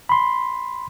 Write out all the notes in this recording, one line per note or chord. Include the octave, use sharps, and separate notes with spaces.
B5 C6